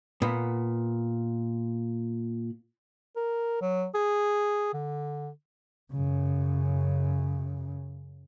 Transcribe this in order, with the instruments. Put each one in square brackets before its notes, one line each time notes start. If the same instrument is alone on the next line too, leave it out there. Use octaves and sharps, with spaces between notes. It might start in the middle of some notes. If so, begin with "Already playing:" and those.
[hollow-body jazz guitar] A#2 B3
[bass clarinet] A#4
F#3
G#4
D3
[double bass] F#2 C#3